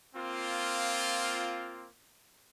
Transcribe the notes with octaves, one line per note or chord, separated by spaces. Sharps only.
A#3 C4 F4